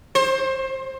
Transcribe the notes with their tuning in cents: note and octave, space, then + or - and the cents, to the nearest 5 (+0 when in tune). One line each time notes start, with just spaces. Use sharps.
C5 +20